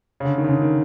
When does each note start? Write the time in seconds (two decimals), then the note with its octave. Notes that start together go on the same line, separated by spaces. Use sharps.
0.20 C#3
0.25 D3
0.38 D#3
0.44 C#3
0.49 D3
0.62 D#3